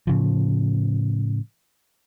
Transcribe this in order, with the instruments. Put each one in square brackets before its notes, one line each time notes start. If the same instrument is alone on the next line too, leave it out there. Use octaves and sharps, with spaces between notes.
[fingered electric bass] A2 C#3 F3